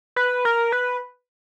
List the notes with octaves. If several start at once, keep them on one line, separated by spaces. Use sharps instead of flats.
B4
A#4
B4